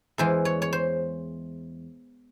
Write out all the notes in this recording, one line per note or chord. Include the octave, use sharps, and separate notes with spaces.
E2 E3 G#3 C5
C#5
C#5
C5